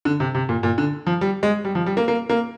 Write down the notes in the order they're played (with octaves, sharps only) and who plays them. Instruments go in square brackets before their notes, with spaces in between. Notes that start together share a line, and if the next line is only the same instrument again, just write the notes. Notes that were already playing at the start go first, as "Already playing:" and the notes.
[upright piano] D3
C3
C3
A#2
A#2
D3
F3
G3
G#3
G3
F3
G3
A#3
A#3
A#3